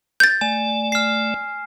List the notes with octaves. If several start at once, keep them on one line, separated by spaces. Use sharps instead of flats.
G6 A6
A3 D5 G#5
F6 C7